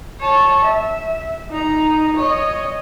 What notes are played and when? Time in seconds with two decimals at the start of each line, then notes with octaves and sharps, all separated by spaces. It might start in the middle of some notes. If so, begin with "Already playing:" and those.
0.20 C#5 A5
0.64 E5
1.50 D#4 A#5
2.16 C#5 D#5